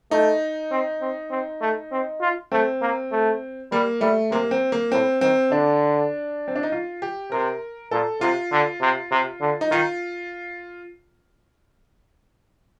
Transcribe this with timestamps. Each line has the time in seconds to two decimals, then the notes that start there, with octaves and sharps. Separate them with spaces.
0.11 A3 D#4
0.71 C4
1.02 C4
1.31 C4
1.62 A3
1.92 C4
2.21 F4
2.52 A3 C4
2.82 A#3
3.12 A3
3.72 G3 A#3
4.01 G3 A3
4.31 C3 A#3
4.51 C4
4.72 A#3
4.92 A2 C4
5.21 D#3 C4
5.51 D3 D4
6.48 C4
6.55 D4
6.63 D#4
6.72 F4
7.02 G4
7.32 C3 A#4
7.91 A#2 A4
8.21 C3 F4
8.52 D3
8.81 C3
9.11 C3
9.41 D3
9.61 D#4
9.71 D#3 F4